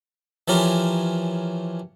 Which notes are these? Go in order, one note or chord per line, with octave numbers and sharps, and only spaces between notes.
E3 F3 C#4 G4 A#4 C5